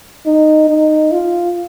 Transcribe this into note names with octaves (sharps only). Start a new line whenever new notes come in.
D#4
D#4
F4